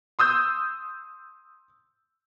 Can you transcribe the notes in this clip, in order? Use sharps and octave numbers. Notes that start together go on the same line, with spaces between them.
C6 D#6 E6 G6